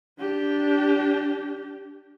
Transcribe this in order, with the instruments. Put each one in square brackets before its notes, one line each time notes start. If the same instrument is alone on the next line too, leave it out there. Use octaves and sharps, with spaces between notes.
[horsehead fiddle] D4 G4